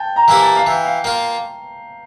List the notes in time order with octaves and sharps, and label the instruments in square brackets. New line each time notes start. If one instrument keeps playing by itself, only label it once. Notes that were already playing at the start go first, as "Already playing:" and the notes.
Already playing: [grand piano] G5 A5
A#5
[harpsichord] E3 A#3 E4 G4
[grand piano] A5
F5
[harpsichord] E3 [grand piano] G5
[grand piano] F5
[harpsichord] A#3 F4 [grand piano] F5